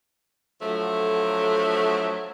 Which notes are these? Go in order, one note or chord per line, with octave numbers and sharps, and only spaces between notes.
D3 F3 F#3 A3